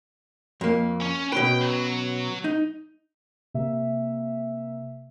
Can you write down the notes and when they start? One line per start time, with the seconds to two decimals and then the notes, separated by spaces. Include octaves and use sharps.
0.61 F2 A#3
1.02 C#4
1.32 B2 C#4 B4 G5
1.61 F#3
2.44 D#4
3.54 C3 A#3 E5